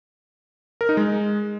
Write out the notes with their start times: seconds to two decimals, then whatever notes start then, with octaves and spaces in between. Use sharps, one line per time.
0.81 A#4
0.89 D#4
0.97 G#3